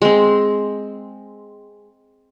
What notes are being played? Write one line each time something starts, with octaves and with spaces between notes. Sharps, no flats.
G#3 C4